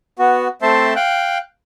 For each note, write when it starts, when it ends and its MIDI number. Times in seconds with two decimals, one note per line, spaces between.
0.19 0.48 59
0.19 0.48 66
0.62 0.94 57
0.62 0.94 60
0.62 0.94 72
0.62 0.94 76
0.62 0.94 81
0.62 0.94 84
0.96 1.38 77
0.96 1.38 79
0.96 1.38 90